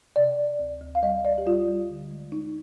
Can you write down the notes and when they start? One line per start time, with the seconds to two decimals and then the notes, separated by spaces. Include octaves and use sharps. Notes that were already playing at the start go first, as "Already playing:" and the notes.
0.16 C3 D5
0.38 C3
0.59 D2
0.81 D2
0.95 F5
1.02 G3 D#5
1.25 D2 D5
1.38 G4
1.46 G3 F4
1.68 G3
1.90 D3
2.11 G#3
2.32 G#3 D#4